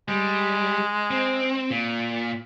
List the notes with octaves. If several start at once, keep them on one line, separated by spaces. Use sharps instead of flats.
G3 G#3
C4
A#2